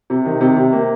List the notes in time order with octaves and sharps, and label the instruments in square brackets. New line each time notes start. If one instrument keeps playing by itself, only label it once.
[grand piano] C3
D#3
C3
C3
A#3